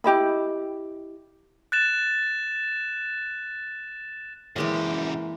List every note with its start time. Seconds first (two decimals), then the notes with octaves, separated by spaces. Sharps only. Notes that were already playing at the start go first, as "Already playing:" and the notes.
0.04 E4 G4 D#5 B5
1.72 F#6 A6 E7
4.56 F#2 E3 G#3 A#3 G4